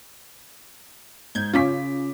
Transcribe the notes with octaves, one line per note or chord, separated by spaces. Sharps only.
G#2 G6 G#6
C#3 C#4 F4 D6 B6